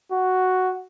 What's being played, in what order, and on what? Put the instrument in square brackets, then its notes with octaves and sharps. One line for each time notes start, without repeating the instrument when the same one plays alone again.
[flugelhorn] F#4